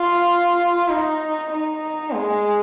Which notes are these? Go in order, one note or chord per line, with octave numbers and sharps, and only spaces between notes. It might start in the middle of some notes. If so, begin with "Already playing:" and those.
Already playing: F4
D#4
D#4
G#3